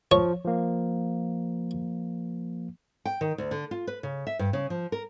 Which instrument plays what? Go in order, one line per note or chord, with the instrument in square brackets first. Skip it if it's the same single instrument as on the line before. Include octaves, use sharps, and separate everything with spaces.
[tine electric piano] F3 [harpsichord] C#5
[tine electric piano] F3 A#3
[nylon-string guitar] G5
D#3
D2
D3
F4
B4
C#3
E5
G2
C#3
F3
A#4